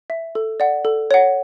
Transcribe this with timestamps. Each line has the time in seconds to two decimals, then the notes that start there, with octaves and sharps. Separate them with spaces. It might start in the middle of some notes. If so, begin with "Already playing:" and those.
0.10 E5
0.35 A4
0.60 D5 F#5
0.85 A4
1.11 C#5 F#5